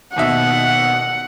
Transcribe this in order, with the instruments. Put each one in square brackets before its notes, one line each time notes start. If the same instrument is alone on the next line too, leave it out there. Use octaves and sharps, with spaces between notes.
[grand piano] D#2 B2 E5 [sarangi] F#5